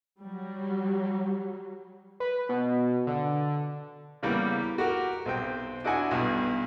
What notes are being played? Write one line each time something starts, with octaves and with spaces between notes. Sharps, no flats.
F#3 G3
B4
B2
D3
C#3 E3 G3 A#3 B3
F#4 G4 A#4
B1 C4 G5
D4 E4 F#4 D#5 F#5 G#5
B1 G2 B2